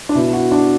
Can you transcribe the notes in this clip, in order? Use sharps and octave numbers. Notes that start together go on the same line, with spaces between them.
D4
B2 E4
F#4
D4